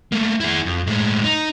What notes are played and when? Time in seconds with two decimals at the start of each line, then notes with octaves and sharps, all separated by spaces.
0.12 A3 A#3
0.40 E4 G#4
0.66 F2
0.87 A2 G#3
1.24 D#4